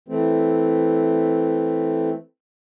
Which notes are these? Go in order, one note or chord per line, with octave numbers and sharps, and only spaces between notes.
E3 A3 C4